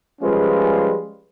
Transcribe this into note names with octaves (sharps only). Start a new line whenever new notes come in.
F3 G3 G#3 C#4 F4 B4